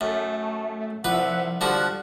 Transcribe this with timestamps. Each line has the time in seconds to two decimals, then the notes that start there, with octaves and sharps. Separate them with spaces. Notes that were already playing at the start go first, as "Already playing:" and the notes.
0.01 F#2 A3
1.04 C2 F3 B4 E5 F#5
1.61 D3 F3 G3 F#4 F#5 F#6